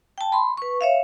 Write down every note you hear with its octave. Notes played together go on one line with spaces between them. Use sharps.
G5 A5
B5 C6
B4 C#6
C#5 E5 F5